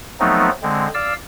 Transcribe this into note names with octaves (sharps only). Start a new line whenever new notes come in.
F3 F#3 A3 B3 C4 D#4
D3 G#3 C4
D5 F5 E6